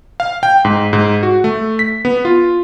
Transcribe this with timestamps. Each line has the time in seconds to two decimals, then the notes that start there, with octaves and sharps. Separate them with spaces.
0.20 F5
0.43 G5
0.65 G#2
0.93 G#2
1.23 F#4
1.44 A3
1.79 B6
2.05 B3
2.25 F4